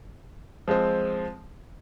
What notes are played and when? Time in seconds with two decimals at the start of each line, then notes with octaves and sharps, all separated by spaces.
0.68 F3 G#3 C4